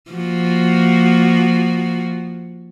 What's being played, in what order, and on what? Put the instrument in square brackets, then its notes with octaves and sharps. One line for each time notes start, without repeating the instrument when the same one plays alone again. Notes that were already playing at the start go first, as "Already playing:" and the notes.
[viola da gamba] F3 A#3 F#4